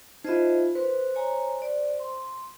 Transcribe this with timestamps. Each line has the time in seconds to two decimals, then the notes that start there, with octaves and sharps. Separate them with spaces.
0.25 D#4 F4 C5 D#5 E5
0.75 B4 C5
1.15 C#5 G#5 A#5
1.62 D5
2.00 C6